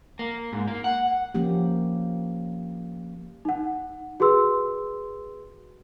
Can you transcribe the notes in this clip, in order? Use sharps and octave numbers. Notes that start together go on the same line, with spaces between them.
A#3
G#2
A#3
F#5
F3 A#3 C#4 G4
D#4 F#5
F#4 G#4 B4 C6 E6